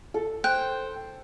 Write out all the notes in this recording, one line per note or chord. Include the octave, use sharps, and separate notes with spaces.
A4
C5 G5 F#6